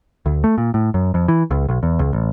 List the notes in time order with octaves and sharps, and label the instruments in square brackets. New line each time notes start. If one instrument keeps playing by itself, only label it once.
[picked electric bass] D2
A3
A#2
A2
F#2
F2
E3
C#2
B1
E2
C#2
A1